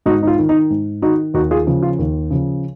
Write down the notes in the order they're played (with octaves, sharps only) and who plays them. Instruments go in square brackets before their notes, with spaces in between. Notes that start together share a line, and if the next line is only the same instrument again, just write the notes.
[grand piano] G#2 D#4 F#4
D#4
F4
D#3
D#4
G#2
D#3 D#4 F#4
D#2 D#4 F#4
F4 G#4
C#3 F3
F4
D#2
C#3 F3